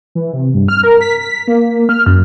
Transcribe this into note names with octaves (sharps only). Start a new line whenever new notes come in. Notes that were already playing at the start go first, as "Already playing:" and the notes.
E3
C3
G2
F6
A#4
B6
B6
A#3
F6
F#2